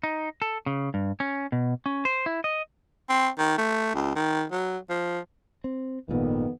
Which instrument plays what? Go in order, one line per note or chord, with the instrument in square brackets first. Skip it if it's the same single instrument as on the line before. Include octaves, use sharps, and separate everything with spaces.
[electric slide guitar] D#4
A4
C#3
G2
C#4
B2
C#4
C5
E4
D#5
[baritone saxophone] C4
D#3
A3
C#2
D#3
F#3
F3
[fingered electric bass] C4
[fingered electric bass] G#1 A#2 [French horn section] F2 D#3 B3